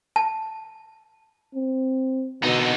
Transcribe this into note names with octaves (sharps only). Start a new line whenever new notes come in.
A5
C4
B2 D3 D#4